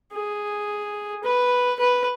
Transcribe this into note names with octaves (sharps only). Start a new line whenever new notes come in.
G#4
B4
B4